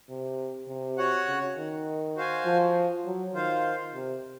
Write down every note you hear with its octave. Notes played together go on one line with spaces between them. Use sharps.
C3
C3
F#4 C#5 F#5
C#3
D#3
F#4 C5 F5 G#5
F3
F#3
D#3 F4 C5 F5
C3